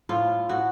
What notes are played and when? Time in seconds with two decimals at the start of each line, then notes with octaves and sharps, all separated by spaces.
0.09 A2 F4
0.49 A2 F#4